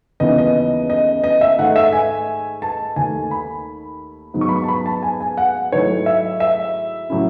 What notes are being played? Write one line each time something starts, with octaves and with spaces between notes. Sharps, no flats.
D#2 C#3 E3 B3 D#5
D#5
D#5
D#5
E5
G#2 D#3 A3 D#4 F#5
E5
G#5
A5
D#2 D#3 A3 G#5
B5
G#2 D#3 F#3 B3
C#6
B5
C#6
A5
B5
A5
G#5
G#5
F#5
G#2 D#3 F#3 A3 E4 C#5
E5
E5
A2 F#3 C#4 E4